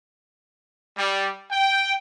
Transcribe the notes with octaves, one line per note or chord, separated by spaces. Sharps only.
G3
G5